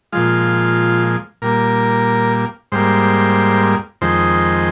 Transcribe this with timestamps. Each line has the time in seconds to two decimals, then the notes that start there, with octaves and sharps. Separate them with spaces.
0.12 A#2 F3 G#3 F4
1.42 A#2 G3 A#3 A#4
2.72 G#2 G3 A#3 C5
4.01 F2 D#3 G#3 C5